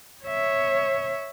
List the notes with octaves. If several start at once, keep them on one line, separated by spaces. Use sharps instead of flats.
C#5 E5